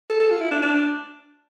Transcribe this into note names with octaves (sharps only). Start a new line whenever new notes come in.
A4
A4
F4
E4
D4
D4